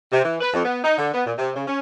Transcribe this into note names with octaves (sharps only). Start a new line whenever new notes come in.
C3
E3
B4
F2
B3
D#4
D3
B3
A#2
C3
C#3
C#4